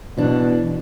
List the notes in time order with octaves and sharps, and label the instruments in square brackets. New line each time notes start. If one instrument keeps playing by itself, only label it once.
[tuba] B2 [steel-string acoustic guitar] E3 D4